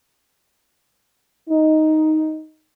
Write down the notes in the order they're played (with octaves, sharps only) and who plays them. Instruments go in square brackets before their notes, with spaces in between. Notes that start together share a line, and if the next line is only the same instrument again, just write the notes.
[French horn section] D#4